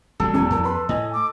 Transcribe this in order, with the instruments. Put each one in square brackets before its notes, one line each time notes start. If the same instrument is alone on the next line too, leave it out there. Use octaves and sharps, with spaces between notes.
[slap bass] D#1 F#3 G#3 [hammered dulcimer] A4
[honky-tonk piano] E2 [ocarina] G#5
[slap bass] F2 [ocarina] A#4
[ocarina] B4 [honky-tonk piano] B5 C6
[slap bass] A2 [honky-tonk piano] D#5 [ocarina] G#5
[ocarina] D6